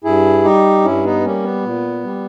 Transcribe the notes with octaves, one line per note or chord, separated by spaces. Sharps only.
G2 E4 G#4
G3 D#4 G4
G2 C#4 E4
B3 D#4
G3 A#3 C#4
B3
A#2
G3